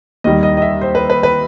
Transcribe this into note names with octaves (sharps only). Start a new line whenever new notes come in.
D#2 D#3 G3 D#5
D#5
D#5
E5
C5
B4
B4
B4